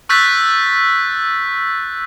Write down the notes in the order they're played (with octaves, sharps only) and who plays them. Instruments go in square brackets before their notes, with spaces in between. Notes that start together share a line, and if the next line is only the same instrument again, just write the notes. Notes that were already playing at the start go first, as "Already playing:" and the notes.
[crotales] C#6 E6 F#6 G6 A6 B6